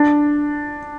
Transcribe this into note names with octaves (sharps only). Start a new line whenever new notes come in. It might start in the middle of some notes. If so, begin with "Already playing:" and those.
Already playing: D4